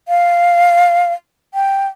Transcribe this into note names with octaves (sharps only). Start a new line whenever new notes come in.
F5
G5